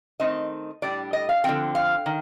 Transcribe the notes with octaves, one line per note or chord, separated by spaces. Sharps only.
D#3 A3 C4 D#4 D#5
A2 G3 D4 D5
D#5
F5
D3 F3 C4 G5
F5
D#3